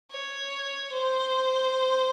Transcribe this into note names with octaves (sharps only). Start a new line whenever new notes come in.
C#5
C5